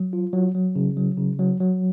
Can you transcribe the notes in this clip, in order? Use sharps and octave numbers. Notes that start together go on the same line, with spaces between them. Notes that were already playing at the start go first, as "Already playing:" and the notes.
Already playing: F#3
F4
F#3
F#3
C#3
F#3
C#3
F#3
F#3